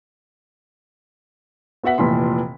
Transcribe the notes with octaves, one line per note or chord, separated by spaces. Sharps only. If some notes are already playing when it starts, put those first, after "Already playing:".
B3 F#4 E5 F#5 B6
F1 A#2 E3 C6